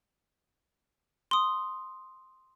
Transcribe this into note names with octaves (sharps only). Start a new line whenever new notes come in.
C6 D#6